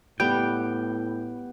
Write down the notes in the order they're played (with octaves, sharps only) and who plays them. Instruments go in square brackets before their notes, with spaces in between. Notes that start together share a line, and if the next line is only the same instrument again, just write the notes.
[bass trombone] A2 [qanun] G3 [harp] B3 [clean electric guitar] G5